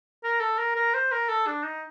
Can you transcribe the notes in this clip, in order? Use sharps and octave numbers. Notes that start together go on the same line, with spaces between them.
A#4
A4
A#4
A#4
C5
A#4
A4
D4
D#4